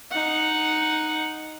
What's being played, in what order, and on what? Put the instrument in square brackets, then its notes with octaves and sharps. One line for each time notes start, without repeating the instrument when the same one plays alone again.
[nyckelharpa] D#4 F#5